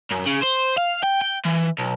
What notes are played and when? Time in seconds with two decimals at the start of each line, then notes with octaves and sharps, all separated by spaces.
0.11 F#2
0.26 C#3
0.42 C5
0.77 F5
1.04 G5
1.22 G5
1.45 E3
1.78 B1